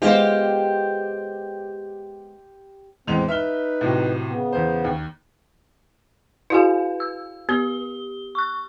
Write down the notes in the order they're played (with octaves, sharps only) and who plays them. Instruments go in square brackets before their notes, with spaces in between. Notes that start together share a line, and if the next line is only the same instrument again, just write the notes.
[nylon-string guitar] G#3 B3 F4 [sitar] G4 C5
[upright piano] E2 G#3 F7 [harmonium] A2 C4
[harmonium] D#4 B4 [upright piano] E5 F6 G7
[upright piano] A2 C3 F#3
[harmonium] C#3 B3
[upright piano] E2 C5
D#2
[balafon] E4 F#4 G#4 [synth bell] B4 F5 G#5
[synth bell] E6
[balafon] B3 [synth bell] G4 G7
[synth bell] C#6 F#6